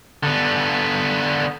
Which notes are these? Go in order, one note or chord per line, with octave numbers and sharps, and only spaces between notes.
D3 B3